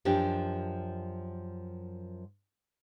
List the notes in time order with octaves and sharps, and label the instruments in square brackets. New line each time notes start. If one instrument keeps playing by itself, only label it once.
[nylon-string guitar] F#2 F3 D4 G4